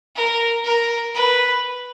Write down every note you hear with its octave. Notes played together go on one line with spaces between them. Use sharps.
A#4
A#4
B4